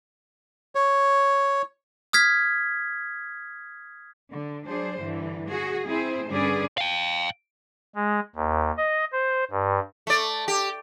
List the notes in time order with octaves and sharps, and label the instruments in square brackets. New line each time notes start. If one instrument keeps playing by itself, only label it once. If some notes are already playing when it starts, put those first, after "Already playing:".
[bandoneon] C#5
[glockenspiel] D#6 F6 G#6 B6
[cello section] D3
F#3 D4 G#4 C5
G2 D3 E3
F#4 G#4
C4 E4 G#4 C5
G2 D3 C#4 G#4 B4 D5
[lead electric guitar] F5 G5
[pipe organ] G#3
D#2
D#5
C5
G2
[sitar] A3 D5
G4